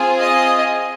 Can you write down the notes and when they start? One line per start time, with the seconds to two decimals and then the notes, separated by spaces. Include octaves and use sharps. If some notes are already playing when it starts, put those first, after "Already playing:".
Already playing: C4 F4 G#4
0.19 D#5